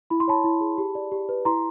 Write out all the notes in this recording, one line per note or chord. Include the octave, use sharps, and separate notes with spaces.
E4 B5
C6
C#5 A5 B5
E4
G#4
G4
D5
G4
B4
E4 A#5 C6